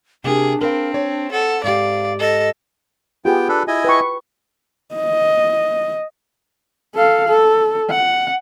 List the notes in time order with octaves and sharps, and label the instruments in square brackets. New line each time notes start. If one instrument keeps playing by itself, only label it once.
[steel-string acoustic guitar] C3 A#3 G4 [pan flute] D4 [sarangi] G#4
[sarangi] C4 [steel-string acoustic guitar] A#4 B4 F5
[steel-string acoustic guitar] C#5
[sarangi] A4 [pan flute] F#5
[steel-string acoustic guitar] G#2 G4 [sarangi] D5 [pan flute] F5
[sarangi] A4 [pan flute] D#5
[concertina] B3 G5 [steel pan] F4 G4 G#4
[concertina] D4 A4 B4
E4 D#5 G#5
[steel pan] B4 G5 C#6
[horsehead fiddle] D#5
A4 F5
A4
F#5